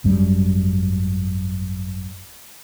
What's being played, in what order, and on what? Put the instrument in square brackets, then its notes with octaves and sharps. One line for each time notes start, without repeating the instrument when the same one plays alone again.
[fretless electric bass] G#1 F#2 G3